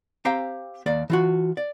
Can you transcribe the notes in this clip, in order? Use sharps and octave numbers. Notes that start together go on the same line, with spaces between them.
C4 G4 C5 F5 G5 A#5
D#2 A#3 D5
E3 F4 F#4
D5